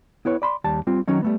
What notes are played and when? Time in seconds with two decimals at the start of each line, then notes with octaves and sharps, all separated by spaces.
0.25 B3 E4 B4 C#5
0.42 D5 B5 C6
0.64 D#2 G3 A5
0.87 G3 C4 F4
1.08 D#3 F#3 C#4 D#4
1.22 G3 A3 B3